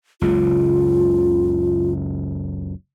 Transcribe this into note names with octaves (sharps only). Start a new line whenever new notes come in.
F#1 C#2 C#3 F4